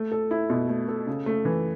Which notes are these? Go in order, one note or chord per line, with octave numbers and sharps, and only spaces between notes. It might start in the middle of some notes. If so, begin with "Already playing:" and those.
Already playing: A3
A4
E4
B2
A3
A4
C#3
A3
E3